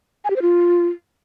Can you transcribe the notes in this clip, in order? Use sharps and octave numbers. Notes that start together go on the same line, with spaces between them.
G#5
G4
C5
F4